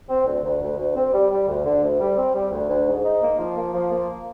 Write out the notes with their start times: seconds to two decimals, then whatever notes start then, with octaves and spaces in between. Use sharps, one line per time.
0.09 C4
0.26 D2
0.44 D2
0.62 D2
0.78 D2
0.96 C4
1.13 G3
1.31 G3
1.48 D2
1.65 D3
1.83 D2
2.00 G3
2.17 C4
2.35 G3
2.52 D2
2.69 D2
2.87 G#2
3.04 D#4
3.22 A#3
3.39 F3
3.56 A#3
3.74 F3
3.91 A#3